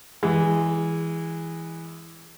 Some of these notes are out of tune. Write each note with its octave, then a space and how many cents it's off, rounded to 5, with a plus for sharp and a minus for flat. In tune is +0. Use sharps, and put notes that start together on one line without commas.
E3 +0 G#3 -15